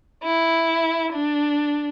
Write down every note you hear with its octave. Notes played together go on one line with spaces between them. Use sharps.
E4
D4